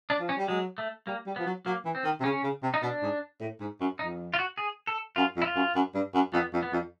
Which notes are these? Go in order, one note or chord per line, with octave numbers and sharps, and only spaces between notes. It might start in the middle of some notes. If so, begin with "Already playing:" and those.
D4
F3
C#4
G3
F#3 G#3
A3
G3 A#3
G3
F3 B3
F#3
F#3 A#3
E3
C4
D#3
C3
C#3 C#4
C#3
C3
D#4
B2 D4
G#2
A2
G#2
F#2
F2 D#4
F4
F#4
G#4
A4
F#2 F4
F2
E4
F4
F#2
F#2
G2
F#2
F2 B3
F2
B3
F2